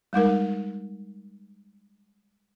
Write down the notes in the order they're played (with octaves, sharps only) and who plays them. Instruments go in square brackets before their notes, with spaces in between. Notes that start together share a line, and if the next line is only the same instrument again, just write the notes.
[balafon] G3 G#3 D#4 A#4